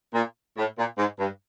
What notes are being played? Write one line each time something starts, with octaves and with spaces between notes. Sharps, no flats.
A#2
A2
A#2
G#2
G2